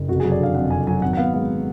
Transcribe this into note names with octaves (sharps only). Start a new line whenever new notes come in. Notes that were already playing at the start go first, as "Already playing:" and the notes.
Already playing: F#1
F1 F#4
F#3 G#4
D5
D3 F5
F2 F#5
F1 G#5
F#3 G#5
G#1 F#5
F#5
B3 F5
G#3 F5